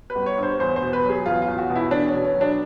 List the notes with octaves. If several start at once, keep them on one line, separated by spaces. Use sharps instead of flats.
B4
G1
C#5
G2
C5
E2 C5
C5
B2
B4
F#3
G#4
E2 F4
F4
E2
F#4
B2
E4
E2 D4
C#4
B2
C#4
F#3
D4